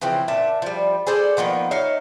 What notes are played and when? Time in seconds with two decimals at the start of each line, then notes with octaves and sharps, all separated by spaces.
0.01 C#3 E3 F3 C4
0.28 A#2 E5 A5
0.62 F3 G3
1.07 G#4 A4 C5 D5
1.37 D#3 F3 A#3 B3
1.71 D#4 C#5 E5 F5